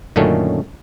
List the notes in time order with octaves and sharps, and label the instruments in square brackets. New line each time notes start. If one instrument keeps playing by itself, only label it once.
[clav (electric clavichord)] F#2 A#2 D3 D#3 A3 C#4